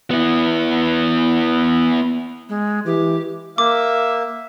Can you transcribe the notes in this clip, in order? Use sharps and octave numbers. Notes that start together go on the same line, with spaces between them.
B3 E4
G#3
E3 G4
A#3 E5 D6